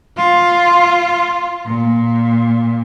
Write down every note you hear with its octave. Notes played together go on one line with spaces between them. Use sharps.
F4
A#2